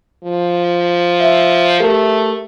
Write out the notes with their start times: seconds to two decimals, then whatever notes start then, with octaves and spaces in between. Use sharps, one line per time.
0.23 F3
1.20 E5
1.80 A3 G4 A#4